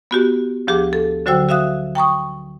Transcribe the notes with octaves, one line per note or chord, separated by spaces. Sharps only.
B3 F#4 G4
D2 F3 G4 G#4 D6
A4
D3 F#3 F#4 C5 G5 E6
F#4 E5 F5 D#6 F#6
G5 A#5 C#6 D#6